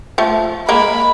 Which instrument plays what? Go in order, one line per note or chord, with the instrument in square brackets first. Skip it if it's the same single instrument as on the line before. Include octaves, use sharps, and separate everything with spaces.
[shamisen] F3 A3
[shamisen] G#3 A#3 [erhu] B5